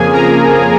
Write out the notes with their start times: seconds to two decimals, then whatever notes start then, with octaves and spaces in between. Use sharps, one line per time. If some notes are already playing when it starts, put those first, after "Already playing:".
Already playing: F2 C#3 F3 A#3 G#4 G#5
0.12 A#4 A#5